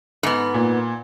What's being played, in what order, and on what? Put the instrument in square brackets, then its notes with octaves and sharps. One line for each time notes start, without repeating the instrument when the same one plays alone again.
[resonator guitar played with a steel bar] G#2 B3
[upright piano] A#2